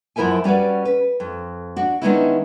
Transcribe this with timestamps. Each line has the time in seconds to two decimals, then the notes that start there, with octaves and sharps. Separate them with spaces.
0.16 F#2 F3 E4 A#4 E5 G#5
0.44 G3 C#4 F#4 B4 D5
0.85 B4
1.20 F2
1.76 D4 F#4
2.02 D#3 G#3 B3 C#4 D4 E4